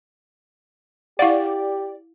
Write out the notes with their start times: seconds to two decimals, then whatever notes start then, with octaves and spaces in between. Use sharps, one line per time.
1.19 E4 G4 D5 F5 F#5